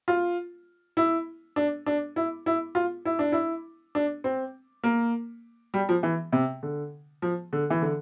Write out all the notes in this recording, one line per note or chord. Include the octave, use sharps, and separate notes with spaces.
F4
E4
D4
D4
E4
E4
F4
E4
D4
E4
D4
C4
A#3
G3
F3
E3
C3
D3
F3
D3
E3
D3